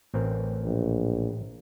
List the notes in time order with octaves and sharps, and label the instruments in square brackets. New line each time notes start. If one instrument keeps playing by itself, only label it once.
[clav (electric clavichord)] A1 C4 A#4
[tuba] A#1